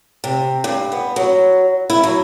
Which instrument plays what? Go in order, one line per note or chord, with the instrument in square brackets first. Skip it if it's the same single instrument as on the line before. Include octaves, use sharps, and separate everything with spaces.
[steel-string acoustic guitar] C3
G2
B3
F#3
E4
F#3